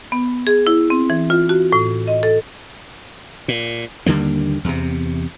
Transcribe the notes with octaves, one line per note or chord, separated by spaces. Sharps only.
B3
G#4
E4
C4
E3
F4
F#4
A2
D#5
A4
A#2
D#2 D3 G3 A#3
E2 C3